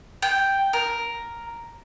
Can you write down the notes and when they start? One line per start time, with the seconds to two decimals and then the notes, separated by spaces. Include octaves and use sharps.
0.22 G5
0.73 A#4